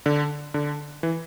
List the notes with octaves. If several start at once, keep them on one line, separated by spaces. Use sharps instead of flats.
D3
D3
E3